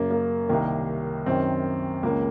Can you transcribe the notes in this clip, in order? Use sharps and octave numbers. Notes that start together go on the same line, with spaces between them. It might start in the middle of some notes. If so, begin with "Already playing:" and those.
Already playing: F#2 C#3 A#3
A#3
C2 C3 D#3 A#3
F#2 D#3 C4
C#2 C#3 A#3